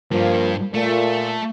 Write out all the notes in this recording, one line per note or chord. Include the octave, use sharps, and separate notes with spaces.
G2 F3 A#3
A#2 A3